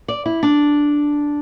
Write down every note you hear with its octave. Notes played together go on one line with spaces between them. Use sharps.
D5
E4
D4